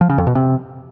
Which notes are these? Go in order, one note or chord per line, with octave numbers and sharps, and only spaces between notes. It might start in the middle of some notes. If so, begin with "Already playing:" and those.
F3
C#3
F2
B2
C3